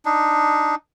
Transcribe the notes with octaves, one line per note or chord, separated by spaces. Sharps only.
D4 D#4